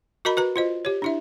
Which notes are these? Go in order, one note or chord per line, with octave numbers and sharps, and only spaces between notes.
F#4 A#4 D#5 A#5 B5
F#4 B4 A#5
F4 C5 D#5
G4 C#5
D4 E4 E5